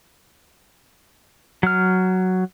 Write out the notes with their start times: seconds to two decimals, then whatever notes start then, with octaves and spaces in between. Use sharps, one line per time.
1.63 F#3 F6